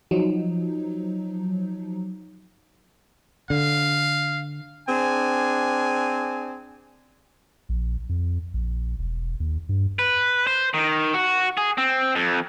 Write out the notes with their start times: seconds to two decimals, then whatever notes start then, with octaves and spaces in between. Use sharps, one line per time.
0.11 F3 F#3 D#4
3.50 D3 F5
4.88 C4 D4 G#4 G#5
7.69 A#1
8.09 F2
8.54 A#1
8.99 E1
9.40 D#2
9.69 G2
9.99 B4
10.47 C5
10.74 D#3
11.14 F#4
11.57 G#4
11.78 C4
12.15 F2